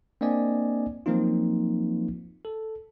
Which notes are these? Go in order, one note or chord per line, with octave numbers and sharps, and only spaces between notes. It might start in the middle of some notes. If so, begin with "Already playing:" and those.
A#3 C4 D4 D5 D#5 G#5
F3 F#3 A#3 C4 D#4 F4
A4